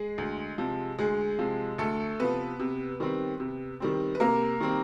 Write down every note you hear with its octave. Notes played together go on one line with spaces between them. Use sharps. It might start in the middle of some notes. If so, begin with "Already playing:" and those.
Already playing: G#3 G#4
D2
C3 F3
D2 G#3 G#4
C3 F3
D2 A3 A4
C3 F3 B3 B4
C3
D#3 G3 C4
C3
D#3 G3 C4
B4
C3 A#3 A#4
D#3 G3 C4